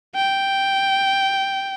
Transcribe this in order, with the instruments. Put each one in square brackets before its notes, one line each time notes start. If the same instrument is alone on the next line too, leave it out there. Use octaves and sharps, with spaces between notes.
[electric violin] G5